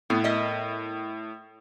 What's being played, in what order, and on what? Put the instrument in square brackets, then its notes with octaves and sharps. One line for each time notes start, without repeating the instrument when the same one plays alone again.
[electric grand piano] A2 [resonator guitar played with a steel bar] B3
[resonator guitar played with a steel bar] A#4 D#5 E5